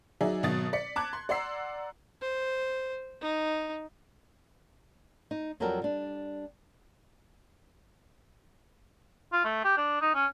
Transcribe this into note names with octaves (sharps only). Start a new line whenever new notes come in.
F#3 D#4 G#4 D5 E5
G#1 B2 F#3 D#6 A6
D5 B6 C#7
A5 D6 F#6 G#6
C6
D5 F#5 A#5 C6 E6 C7
C5
D#4
D#4
F2 F#3 G3 A4 A#4 G5
G3 D4
F4
A3
G4
D4
D#4
C#4